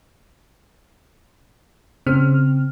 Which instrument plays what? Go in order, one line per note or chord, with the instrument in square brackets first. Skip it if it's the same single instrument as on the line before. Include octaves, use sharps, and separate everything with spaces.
[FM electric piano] C#3 C4 F6